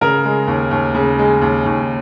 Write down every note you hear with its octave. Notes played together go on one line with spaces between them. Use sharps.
C#3 A#4
G#3
D#2
D#2
C#3
G#3
D#2
D#2